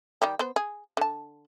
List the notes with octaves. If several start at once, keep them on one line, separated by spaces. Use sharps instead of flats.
D#3 G3 G4
B3 C5
G#4
D3 A5